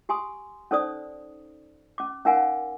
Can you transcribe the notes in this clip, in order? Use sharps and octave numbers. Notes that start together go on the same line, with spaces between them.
G4 G#5 C6 D#6
C#4 D#4 A4 C5 D5 D#6
C#4 D6
C#4 D#4 A#4 F5 F#5 G#5